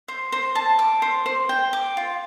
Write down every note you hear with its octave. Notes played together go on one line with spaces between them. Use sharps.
C5
C5
A5
D6
C5
C5
G5
D6
F4